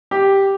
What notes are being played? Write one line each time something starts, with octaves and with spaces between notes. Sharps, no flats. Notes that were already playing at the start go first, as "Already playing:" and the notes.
G4